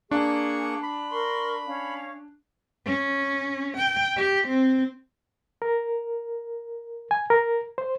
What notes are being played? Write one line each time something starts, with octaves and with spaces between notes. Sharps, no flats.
A#3 D4 G#4 C#6
B5
A#4 C6 C#6
C#4 F5
C#4
G5
G4
C4
A#4
G#5
A#4
C5